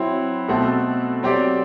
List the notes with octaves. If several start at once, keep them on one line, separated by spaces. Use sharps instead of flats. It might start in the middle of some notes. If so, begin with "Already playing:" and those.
Already playing: F#3 C4 E4
B2 A3 C4 F#4 A4
F#3 C4 G4 D5